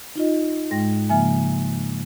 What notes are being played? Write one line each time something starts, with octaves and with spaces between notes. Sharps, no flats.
D#4 F4 D#5
G#2 G#3 G5 A#6
C#3 F3 A#3 E5 G#5